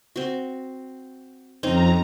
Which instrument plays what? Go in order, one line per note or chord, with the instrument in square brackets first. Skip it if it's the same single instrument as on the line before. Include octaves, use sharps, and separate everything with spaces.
[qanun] C4 F#4
[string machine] F2 A#5 [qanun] C4 C#4 D#4